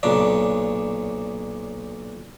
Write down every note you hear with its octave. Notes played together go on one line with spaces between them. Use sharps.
B1 A#2 C#3 D4